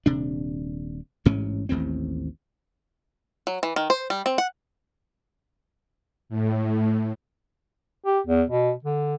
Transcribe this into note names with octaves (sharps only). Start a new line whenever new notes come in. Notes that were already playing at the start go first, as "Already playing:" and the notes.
D#1 C3 D4
A1 G#2 C3 C#4
A1 D#2 A2 C4
F#3
E3
D#3
C5
G3
C4
F#5
A2
G4
E2
B2
D3